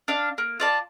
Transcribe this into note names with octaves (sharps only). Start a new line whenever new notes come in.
D4 F5
A#3
F4 D5 A5